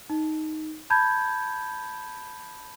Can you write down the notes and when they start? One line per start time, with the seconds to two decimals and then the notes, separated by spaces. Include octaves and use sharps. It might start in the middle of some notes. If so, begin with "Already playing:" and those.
0.10 D#4
0.90 A5 B5 G6 G#6